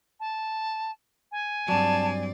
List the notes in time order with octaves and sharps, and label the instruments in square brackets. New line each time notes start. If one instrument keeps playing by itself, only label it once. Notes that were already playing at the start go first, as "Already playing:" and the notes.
[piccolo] A5
G#5
[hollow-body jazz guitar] G2 F#3 [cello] C4 D5 [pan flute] A5